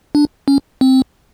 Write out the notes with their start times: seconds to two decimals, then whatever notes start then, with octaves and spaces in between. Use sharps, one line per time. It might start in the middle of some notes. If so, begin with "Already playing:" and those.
0.15 D4
0.48 C#4
0.81 C4